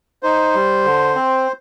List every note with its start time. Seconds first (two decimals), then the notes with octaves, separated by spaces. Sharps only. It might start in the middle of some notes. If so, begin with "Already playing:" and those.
0.23 D#4 C5
0.55 G3
0.85 D3
1.15 C4